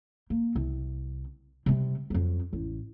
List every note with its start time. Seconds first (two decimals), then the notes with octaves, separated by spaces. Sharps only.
0.30 A#3
0.56 C2
1.66 C3 G3
2.10 F2 F#3
2.53 A1